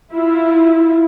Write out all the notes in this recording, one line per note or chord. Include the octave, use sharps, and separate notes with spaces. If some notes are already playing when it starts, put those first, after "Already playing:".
E4 F4